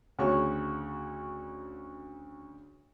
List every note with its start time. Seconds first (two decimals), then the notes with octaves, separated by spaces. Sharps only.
0.19 D2 C#3 F#4 C#5 C#6